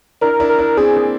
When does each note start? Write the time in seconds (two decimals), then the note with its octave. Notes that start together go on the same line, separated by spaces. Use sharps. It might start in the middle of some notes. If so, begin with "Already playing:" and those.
0.21 D4 E4 A#4
0.40 D4 E4
0.49 A#4
0.59 D4 E4
0.77 C4 D4 G#4
0.96 A#3 C4